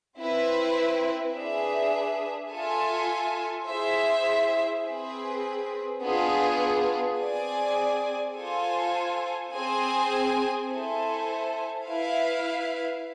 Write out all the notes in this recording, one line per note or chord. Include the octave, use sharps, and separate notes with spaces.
C4 E4 B4
D4 G#4 B4 E5
F4 A4 E5 G#5
E4 G#4 C5 E5
C4 G#4 B4
B3 D4 F4 G#4
C4 G#4 D5 G#5
F4 A4 C5 G#5
C4 G#4 C5 G#5
E4 A4 C5 E5 G#5
E4 B4 F5